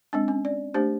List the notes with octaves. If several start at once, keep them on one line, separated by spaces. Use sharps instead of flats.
G#3 C4 D4
C#4
D5
A3 D4 G4 C5